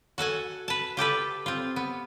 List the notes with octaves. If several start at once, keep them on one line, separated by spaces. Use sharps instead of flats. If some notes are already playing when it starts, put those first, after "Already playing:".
F#4 A4 F#5 G#5
B4 A5
F4 G4 A4 B4
C4 F4
B3